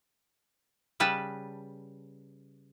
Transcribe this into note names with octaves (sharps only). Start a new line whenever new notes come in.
C#3 G3 B4 A5